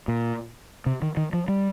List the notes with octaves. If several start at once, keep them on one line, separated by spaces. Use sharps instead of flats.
A#2
C3
D#3
D#3
F3
G3